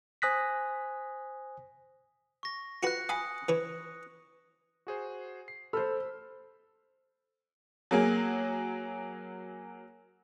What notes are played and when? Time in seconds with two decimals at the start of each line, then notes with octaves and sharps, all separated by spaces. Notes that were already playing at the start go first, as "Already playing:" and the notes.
0.22 C5 G#5 D#6 F#6 A#6 B6
2.43 C#6 A#6
2.83 F4 F#4 B4 F#6 A#6 C#7
3.09 F5 G#5 B5 D#6
3.49 E3 B4 C#5
4.87 F#4 G#4 C5
5.48 C7
5.73 A4 C5 B5 E6 F6
7.91 F#3 A#3 G#4